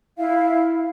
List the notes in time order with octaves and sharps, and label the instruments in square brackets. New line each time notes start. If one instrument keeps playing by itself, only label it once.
[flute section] E4 F5